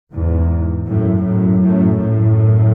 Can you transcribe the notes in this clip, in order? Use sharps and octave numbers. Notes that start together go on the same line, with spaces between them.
E2 G#2
F#2 A2
F#2 A2
F#2 A2
F#2 A2